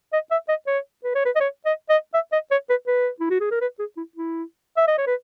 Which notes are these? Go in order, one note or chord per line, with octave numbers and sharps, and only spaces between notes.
D#5
E5
D#5
C#5
B4
C#5
B4
D#5
C#5
D#5
D#5
E5
D#5
C#5
B4
B4
E4
F#4
G#4
A#4
B4
G#4
E4
E4
E5
D#5
C#5
B4